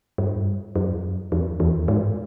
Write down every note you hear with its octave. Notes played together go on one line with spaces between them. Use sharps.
G2
F#2
F2
E2
G#2